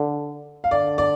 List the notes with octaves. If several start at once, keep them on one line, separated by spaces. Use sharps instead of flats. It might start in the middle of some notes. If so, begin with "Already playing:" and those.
Already playing: D3
F5
D3 D5
D5